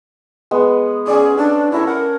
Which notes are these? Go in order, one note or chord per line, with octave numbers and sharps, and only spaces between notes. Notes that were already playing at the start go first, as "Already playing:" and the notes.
G#3 B3
C#4 G#4 D5
D4 A4
E4 A4 A#4 C#5
A#4 F#5